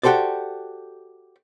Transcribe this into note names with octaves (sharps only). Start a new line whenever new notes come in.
F#4 G4 A4 C5 D5